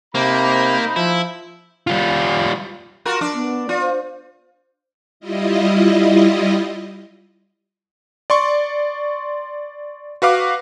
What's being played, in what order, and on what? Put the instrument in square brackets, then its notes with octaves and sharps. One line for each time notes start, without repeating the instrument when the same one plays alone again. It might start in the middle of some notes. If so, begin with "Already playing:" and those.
[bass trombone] C3 [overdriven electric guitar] A#3 [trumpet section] D#4 C5 B5
[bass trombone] F3 [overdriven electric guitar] E4
[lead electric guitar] G3 F4
[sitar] F4 F#4 A#4
D4 D5
[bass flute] B3
[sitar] F4 [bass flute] D5
[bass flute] C5
[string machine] G3 E4 F4 D#5
[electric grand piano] D5 C6 C#6
F#4 B4 F5 D6